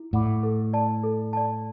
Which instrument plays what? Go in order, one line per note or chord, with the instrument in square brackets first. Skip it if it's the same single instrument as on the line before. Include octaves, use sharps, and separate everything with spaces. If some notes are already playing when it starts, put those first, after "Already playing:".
Already playing: [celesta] E4
[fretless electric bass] A2 [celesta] D5 F#5 B5 D6
[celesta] A4
D5 A5
A4
D5 A5